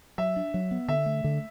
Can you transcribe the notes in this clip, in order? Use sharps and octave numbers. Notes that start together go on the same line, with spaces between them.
F#3 E5
D4
F#3
B3
D3 E5
A3
D3